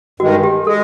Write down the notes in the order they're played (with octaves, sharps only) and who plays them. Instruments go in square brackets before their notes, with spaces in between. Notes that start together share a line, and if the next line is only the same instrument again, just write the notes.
[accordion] G2 D#3 G#3 [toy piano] F#4
[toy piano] G4
[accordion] G#3 [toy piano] A4